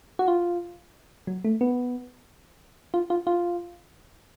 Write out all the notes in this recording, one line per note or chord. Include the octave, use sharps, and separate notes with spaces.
F#4
F4
F#3
A3
B3
F4
F4
F4